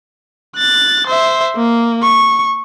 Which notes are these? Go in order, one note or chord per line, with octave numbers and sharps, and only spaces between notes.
F#6 A6
C5 E5
A#3
C#6